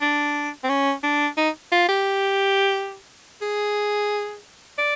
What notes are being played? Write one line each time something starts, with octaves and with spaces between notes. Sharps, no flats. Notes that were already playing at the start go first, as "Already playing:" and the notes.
D4
C4
C#4
D4
D#4
F4
G4
G#4
D5